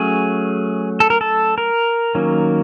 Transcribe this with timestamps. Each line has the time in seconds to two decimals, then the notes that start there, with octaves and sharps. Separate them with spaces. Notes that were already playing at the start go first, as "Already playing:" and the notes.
Already playing: F#3 A3 C#4 G#4
1.00 A4
1.10 A#4
1.21 A4
1.58 A#4
2.15 D#3 F#3 A#3 C#4